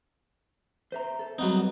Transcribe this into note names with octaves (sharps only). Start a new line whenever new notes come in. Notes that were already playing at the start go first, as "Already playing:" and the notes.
C5 E5 A#5
A4
F#3 G3 B3 C4 D#4